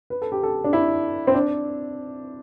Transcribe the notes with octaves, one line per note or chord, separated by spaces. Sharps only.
B4
A4
G4
A4
D4
E4
C4
D4